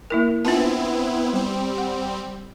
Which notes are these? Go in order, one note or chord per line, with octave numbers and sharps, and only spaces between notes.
A#3 E4 A#4
B3 C4 D4 E4 F4 A5
G3 C4
F#5